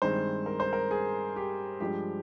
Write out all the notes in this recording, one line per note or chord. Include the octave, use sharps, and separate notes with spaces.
G2 D#3 G#3 C4 C5
A#4
C5
A#4
G#4
G4
G2 F3 G#3 G4